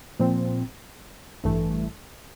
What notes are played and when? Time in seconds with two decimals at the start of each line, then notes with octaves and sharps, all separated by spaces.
0.20 A#2 F3 C4
1.44 A1 G2 E3 A3